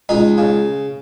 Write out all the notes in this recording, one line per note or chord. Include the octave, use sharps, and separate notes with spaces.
C#2 D#4
C#3